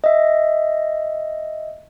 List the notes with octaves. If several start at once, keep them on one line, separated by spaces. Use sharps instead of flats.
D#5 E5